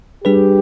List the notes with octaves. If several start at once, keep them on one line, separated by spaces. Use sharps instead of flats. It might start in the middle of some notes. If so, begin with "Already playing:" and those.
G3 D4 G4 G#4 B4